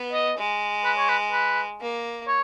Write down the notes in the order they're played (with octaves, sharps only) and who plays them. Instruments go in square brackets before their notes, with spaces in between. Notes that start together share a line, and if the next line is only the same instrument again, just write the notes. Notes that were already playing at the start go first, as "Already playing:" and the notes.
Already playing: [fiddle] B3
[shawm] D#5
[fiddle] G#3
[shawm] B4
C#5
B4
B4
[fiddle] A#3
[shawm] C#5